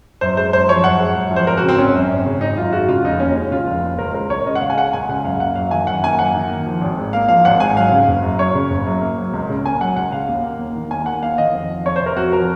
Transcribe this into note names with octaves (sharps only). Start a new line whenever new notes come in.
F#2 C5
G#3 C5
F#2 C5
F3 C#5
F#2 F#5
G#3
F#2
F3
C5
G#1 A#4
F#4
C#3
C4
G#1 C#4
F#2
G#1
C#3
G#1 D#4
F#2 F4
G#3 F#4
C#3 F4
F1 D#4
D#2 C#4
G#3 C#4
C#3 F4
F1
D#2
C#2 A#4
G#3 A#4
C#2 C#5
C#3 D#5
F#5
C#2 F5
G#5
G#3 F#5
C#2 G#5
C#3 F#5
F#2 F5
A#3 F#5
F#2 F5
D#3 G#5
F#2 F#5
A#3 G#5
F#2 F#5
D#3
A#3
F3
G#1
G#2
A#3 F5
F3 F5
G#1 F#5
G#2 G#5
F#3 F5
C#3
F#1
F#2
F#3 C#5
C#3
F#1
F#2
A#3
F#3
C#2
C#3
A#3 G#5
F#3 F#5
C#2 F#5
C#3 F5
D#2
A#3
D#2
D#3
D#2 G#5
A#3 F#5
D#2 F5
D#3 D#5
F2
F3
F2 C#5
C3 C5
A#4
F2 F#4
F3 A#4